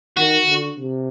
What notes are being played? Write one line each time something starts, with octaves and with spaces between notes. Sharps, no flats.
D#3 F#4
D3
C3